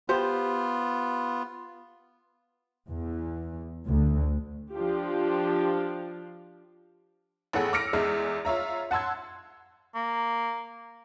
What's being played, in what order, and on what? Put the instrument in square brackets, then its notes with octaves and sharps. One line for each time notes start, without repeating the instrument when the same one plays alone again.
[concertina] B3 F4 [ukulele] G4 C5
[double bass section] E2
D2
[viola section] F3 D4 F4 G4
[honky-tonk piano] A1 B3 G#4 A4 F#5
D6 E6 F6 A#6 C#7 D7
E2 G#3 E5 F6
F4 C#5 E5 A#5
F#5 A5 C6 E6 G#6
[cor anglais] A#3